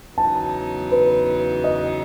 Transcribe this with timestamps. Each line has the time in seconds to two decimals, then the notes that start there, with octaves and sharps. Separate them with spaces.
0.17 E2 C#3 F#3 B3 D#4 A5
0.92 B4
1.64 D#5